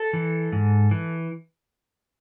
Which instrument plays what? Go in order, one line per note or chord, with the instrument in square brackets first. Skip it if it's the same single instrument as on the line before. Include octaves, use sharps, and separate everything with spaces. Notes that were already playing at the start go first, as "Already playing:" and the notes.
Already playing: [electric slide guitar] A4
E3
G#2
E3